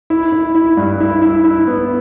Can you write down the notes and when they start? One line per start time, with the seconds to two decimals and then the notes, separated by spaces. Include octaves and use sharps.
0.10 E4
0.32 E4
0.55 E4
0.77 G2
1.00 E4
1.22 E4
1.44 E4
1.67 B3